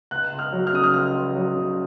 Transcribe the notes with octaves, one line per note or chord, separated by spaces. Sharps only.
C#2 F#6
C#2
F6
F#3
F6
C#3 D#6
F6
C#2 F6
C#2
F#3
C#3